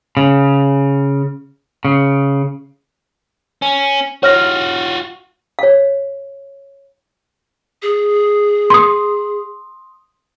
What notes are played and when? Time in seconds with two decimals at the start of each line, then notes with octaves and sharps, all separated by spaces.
0.17 C#3
1.85 C#3
3.62 C#4
4.23 F4 F#4 C#5 F6 A#6
5.59 C#5 F5
7.82 G#4
8.70 C6 D#6